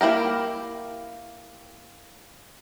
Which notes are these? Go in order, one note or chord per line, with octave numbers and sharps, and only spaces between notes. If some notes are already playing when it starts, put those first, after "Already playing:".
A#3 E4 G4 A#4